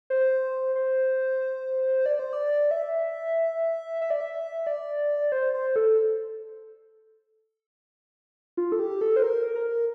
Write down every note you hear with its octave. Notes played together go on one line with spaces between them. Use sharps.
C5
C5
D5
C5
D5
E5
E5
D5
E5
D5
C5
C5
A4
F4
A4
G4
A4
C5
A#4
A#4